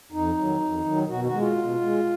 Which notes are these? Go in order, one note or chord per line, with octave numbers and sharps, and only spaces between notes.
F2 D#4
D#3 F#3
F2
D#3 F#3
B2 F#4
F#4
G#3
F4
B2
G#3